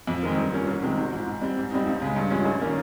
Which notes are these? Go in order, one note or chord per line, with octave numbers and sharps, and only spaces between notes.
F2
D#3 G#3 C4
G2
F3 A#3 C#4
C2
C3 D#3 G#3 C4
G#1
G#2 F3
G#2
G3 C4
G#2
G3 C4 D#4
C#2
C#3 G#3
G2
F3 G#3 C#4
A#1
D#3 A#3 C#4